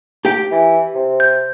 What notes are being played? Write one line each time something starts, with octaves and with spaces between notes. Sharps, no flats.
G4 G5
E3
C3
G6